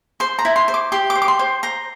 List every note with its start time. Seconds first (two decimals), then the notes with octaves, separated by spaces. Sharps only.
0.20 C5 C6
0.39 A#5
0.45 E4
0.56 C6
0.68 C5
0.74 D6
0.92 G4 C6
1.10 D6
1.15 C5
1.22 D6
1.28 C6
1.39 C5
1.63 C5 A#5